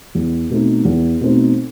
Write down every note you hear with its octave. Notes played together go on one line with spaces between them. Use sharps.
E2
B2 A3 C4 D#4
E2
B2 A3 C4 D#4